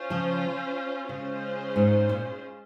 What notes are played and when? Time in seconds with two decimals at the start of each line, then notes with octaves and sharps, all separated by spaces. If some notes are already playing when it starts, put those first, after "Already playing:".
Already playing: C#4 F4 C5
0.10 C#3 F3
1.09 C#3 G#3 C#4 F4 G#4 C5
1.76 G#2
2.09 A#2